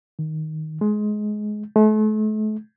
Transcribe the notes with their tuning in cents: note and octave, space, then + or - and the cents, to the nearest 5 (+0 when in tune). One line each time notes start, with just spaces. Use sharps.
D#3 +5
G#3 +20
A3 -40